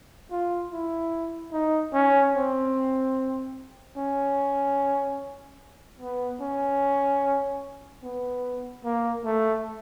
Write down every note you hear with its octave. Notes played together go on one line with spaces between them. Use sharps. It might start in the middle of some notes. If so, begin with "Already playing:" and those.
F4
E4
D#4
C#4
C4
C#4
B3
C#4
B3
A#3
A3